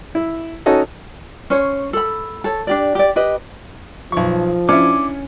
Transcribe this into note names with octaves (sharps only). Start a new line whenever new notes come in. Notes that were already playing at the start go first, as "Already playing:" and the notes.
E4
C#4 D#4 F#4 A4 D#5
C#4 C5 C#5
A4 B5
A4 C#5
D4 G4 D5
G4 D5
G4 B4 D#5
B1 F3 C#6
C#4 D4 E4 D6